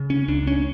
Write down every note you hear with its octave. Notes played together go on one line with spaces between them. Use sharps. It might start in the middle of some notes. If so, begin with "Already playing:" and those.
Already playing: C#3
C#4
C#2 D4
C#4